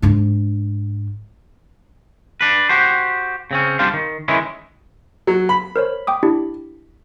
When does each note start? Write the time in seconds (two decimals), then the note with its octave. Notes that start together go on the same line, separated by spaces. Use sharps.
0.02 G#2 D4
2.41 D4 B4
2.69 F#4 G4 C5
3.51 C#3 C4 C#4
3.79 G3 C4 D4 F4 C5 F5
3.93 D#3
4.28 D#3 E3 G#3 C#4 E4
5.27 F#3
5.49 B5
5.76 A#4 C5 C#5
6.07 G5 D6 D#6
6.23 D4 E4 G4